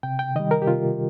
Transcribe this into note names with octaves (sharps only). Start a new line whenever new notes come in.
C3 G5
G5
D#3 G3 D#5
A#4
G4
C3 F4